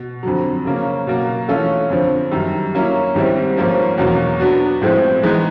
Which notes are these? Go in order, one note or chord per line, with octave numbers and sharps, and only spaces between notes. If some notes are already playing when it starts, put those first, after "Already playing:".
Already playing: B2
F2 D3 F#3
C#3 F#3 A#3 C#4
B2 F#3 A#3
E3 A3 C#4 F4 A4
F2 D3 F3
F#2 D#3 G3
F#3 A#3 C#4 E4
G#2 D#3 G3 C4 E4
G#2 F3 A#3 C#4
E2 B2 F#3 A#3 C#4
F#3 B3 D4 F#4
A2 F3 G#3 C4 E4
E3 G#3 B3 D#4